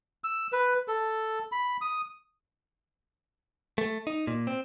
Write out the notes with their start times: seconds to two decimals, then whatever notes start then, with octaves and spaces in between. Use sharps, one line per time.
0.24 E6
0.52 B4
0.88 A4
1.52 B5
1.81 D#6
3.78 A3
4.07 D#4
4.27 A#2
4.47 C4